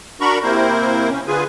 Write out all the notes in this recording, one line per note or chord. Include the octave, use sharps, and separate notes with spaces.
D4 F#4 A#4 A#5 B5 C#6
C3 A#3 C4 E4 A#4 C5
C#4
D3 F4 G#4 B4 G#5